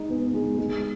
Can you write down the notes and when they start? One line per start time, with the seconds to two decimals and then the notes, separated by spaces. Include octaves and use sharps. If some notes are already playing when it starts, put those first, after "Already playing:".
Already playing: G#3 D#4
0.10 B3
0.34 G#3
0.58 G#3